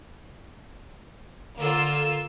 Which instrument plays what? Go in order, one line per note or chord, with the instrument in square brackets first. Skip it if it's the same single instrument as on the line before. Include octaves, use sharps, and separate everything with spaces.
[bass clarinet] D3 [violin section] A#3 F4 E6